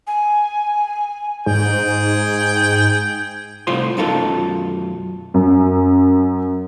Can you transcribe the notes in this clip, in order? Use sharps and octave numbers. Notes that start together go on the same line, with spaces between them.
G#5
G#2 G#4 G5
C2 A2 C3 F4 C5 C6
B1 F#2 D#4 F4 A4 A#4
F#2